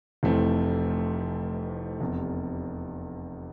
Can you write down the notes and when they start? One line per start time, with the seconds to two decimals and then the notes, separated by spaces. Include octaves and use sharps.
0.23 F1 F2 E3 A3 C4
2.01 F1 E2 C3